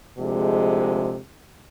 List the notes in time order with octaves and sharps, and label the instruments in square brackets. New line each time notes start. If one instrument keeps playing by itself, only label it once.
[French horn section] D2 C3 F3 G#3